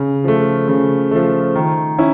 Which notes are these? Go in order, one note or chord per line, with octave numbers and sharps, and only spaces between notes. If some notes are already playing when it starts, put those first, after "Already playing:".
Already playing: C#3
F3 A3
C#3
F3 A3
D#3
C#4 E4